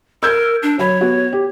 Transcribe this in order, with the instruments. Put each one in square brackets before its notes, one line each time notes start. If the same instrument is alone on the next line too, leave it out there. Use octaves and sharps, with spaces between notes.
[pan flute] A#4 [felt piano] E6 G6 G#6
[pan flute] D4
[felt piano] F#3 B5 [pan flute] C#5
[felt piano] B3 F#4
G4